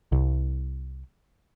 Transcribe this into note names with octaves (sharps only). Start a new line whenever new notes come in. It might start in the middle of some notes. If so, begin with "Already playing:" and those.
C2